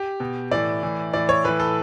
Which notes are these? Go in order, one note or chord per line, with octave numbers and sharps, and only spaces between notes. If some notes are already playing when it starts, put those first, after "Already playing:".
Already playing: G4
B2
A2 E3 D5
A2 E3
A2 E3 D5
C#5
A2 E3 B4
A4